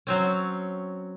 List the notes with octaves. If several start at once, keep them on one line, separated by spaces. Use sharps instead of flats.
F#3 C4 C#4